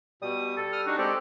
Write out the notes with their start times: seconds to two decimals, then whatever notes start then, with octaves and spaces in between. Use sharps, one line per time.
0.22 B2 G3 D#6
0.57 A4
0.73 D#6 F6
0.87 D4 D#4 F#4
0.98 G#3 C4 G4 A4 D5